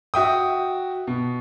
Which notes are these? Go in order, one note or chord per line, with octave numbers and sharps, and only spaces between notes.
F#4 E5 G5 D#6
B2